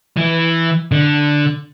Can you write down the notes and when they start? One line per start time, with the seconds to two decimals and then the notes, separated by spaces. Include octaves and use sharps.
0.17 E3
0.92 D3